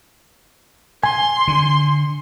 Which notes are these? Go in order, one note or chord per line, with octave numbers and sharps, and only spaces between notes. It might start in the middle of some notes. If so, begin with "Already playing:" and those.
G#5 C6
D3